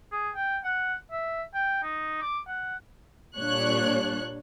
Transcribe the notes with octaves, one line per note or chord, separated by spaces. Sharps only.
G#4
G5
F#5
E5
G5
D#4
D6
F#5
A#2 G3 D4 C#5 F#6